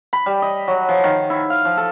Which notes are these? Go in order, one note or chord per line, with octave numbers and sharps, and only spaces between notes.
B5
G3
D#5
F#3
F3
D#3
E4
F5
F3
A4